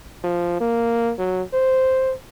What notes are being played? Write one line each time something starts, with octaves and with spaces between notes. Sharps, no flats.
F3
A#3
F#3
C5